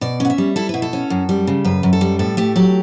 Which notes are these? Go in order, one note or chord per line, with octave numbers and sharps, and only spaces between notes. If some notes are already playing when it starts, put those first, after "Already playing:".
B2 D5
C#4 F#5
E5
G3
E4 A4
B2 B4
A4
C#4
F#2
G3
C#3
F#2 B4
F#2
A4
G3
A2 A4
A3 G4
F#3 G4